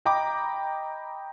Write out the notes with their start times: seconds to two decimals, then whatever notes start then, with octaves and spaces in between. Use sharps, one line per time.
0.05 D#5 G5 A#5 B5 D6